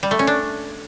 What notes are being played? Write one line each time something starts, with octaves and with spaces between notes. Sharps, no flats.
G3
A3
C#4
D4